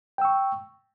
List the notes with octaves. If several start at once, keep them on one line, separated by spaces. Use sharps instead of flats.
G5 C#6 E6